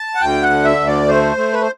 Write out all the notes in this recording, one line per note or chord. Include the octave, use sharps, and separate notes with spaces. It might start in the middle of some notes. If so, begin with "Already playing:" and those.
Already playing: A5
F#5
D2 G5
F#5
D3
E5
D2
D5
A3 C5
A3
B4
C5